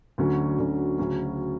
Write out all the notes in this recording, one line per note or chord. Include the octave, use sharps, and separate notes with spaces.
D2 D3 F#3 C#4
D2 D3 F#3 C#4
D2 C#3 F#3 C#4